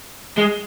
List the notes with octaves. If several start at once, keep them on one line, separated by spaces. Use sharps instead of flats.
G#3